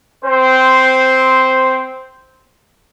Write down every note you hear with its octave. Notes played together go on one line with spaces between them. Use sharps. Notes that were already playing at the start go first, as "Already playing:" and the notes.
C4 C5